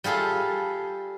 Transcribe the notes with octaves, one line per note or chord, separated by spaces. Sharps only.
G3 F4 G#4 A4